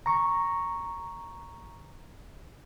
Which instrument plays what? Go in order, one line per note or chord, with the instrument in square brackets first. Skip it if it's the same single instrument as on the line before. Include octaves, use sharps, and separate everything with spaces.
[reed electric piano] A#5 C#6